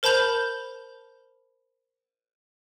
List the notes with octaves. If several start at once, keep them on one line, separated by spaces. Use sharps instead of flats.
A#4 C5 A5 B5 G6 F7